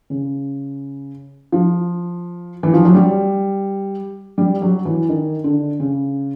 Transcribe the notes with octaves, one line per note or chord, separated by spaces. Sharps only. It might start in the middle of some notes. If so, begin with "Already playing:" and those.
C#3
F3
E3
F3
F#3
G3
G3
F#3
E3
D#3
D3
C#3